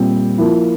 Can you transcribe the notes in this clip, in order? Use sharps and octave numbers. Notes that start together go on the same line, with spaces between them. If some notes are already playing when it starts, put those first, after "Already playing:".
Already playing: A#2 G3 C4
F3 A#3 E4